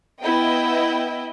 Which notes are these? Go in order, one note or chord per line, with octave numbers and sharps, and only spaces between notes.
B3 E4 D#5 G5